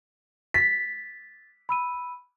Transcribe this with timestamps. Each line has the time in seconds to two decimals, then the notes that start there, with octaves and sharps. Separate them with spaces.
0.54 A6 B6
1.69 B5 E6 D#7